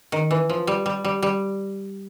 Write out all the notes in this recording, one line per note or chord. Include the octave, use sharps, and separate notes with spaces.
D#3
E3
F3
G3
G3
G3
G3